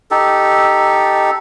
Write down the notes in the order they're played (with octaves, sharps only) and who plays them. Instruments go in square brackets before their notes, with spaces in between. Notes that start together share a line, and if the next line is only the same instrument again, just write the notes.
[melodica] D#4 G4 A4